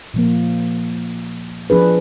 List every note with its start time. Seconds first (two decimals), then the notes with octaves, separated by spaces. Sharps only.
0.14 A#2 F3 A#3
1.70 F3 D4 G#4 B4